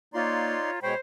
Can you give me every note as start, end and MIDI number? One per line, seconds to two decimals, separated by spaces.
0.14 0.56 58
0.14 0.71 63
0.14 0.80 65
0.14 0.80 73
0.14 0.71 74
0.14 0.80 82
0.14 0.71 84
0.83 0.94 47
0.83 0.94 56
0.83 1.00 72
0.83 0.94 73
0.83 0.94 79
0.83 0.94 83
0.83 0.94 85